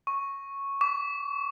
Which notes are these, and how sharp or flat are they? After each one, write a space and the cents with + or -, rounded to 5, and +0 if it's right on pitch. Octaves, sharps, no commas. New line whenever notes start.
C#6 -5
D6 -45